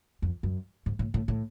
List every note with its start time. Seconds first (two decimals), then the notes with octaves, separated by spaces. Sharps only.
0.22 F2
0.43 F#2
0.86 G#2
0.99 A2
1.14 A2
1.28 A2